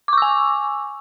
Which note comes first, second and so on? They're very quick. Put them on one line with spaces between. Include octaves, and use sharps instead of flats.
D6 C#6 E6 G#5